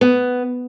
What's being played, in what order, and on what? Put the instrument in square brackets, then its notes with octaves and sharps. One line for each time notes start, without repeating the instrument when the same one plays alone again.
[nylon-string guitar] B3